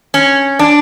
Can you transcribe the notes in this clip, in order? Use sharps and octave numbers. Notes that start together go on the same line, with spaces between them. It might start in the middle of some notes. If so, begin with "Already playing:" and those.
C#4
D4